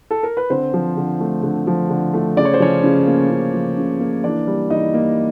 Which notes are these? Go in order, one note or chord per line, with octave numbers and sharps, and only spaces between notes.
A4
A#4
B4
D3 C4 C5
F3
D3
A3
D3
F3
D3
A3
C#3 D5
C#5
C5
F3 C#4 C#5
C#3
A#3
C#3
F3
C#3
A#3
E3 D4 D5
G3
E3 D#4 D#5
A#3